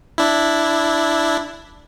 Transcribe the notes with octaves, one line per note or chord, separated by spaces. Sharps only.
D4 E4